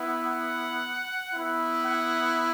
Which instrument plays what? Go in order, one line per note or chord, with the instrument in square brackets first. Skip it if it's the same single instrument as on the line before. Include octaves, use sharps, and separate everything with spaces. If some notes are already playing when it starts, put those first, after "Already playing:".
Already playing: [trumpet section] B3 E4
F#5
B3 E4
F#5